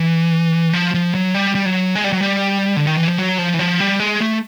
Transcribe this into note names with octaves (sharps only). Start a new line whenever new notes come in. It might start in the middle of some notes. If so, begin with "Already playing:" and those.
Already playing: E3
F3
F3
F#3
G3
G3
F#3
G#3
G3
F#3
G3
D3
D#3
E3
F3
F#3
F3
E3
F3
G3
G#3
A3